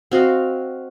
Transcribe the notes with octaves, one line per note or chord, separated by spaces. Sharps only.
C4 F#4 D#5 F5